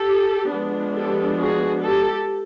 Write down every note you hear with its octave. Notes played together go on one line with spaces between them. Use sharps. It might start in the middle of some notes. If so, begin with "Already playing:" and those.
Already playing: G4 A4
F3 G#3 B3 D4
G4 A4
F#4 G#4
G4 A4